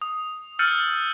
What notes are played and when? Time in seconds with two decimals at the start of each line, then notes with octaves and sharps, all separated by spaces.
0.02 D#6
0.59 E6 F6 G6 A6 C#7 D#7